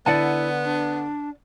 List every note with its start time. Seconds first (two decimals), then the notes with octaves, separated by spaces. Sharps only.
0.06 D3 B3 E4 D5 F#5 A5 D#7
0.64 D4